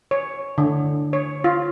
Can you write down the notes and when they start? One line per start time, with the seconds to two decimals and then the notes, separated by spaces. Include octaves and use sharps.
0.11 C#5
0.58 D3
1.13 C#5
1.44 F4